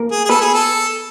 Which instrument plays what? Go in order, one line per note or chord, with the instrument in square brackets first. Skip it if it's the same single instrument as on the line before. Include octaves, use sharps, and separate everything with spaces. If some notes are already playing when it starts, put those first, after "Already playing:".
Already playing: [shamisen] A#3 A#4
[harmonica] G#4
G#4
[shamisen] B3 B4 [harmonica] A4
[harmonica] G#4
A4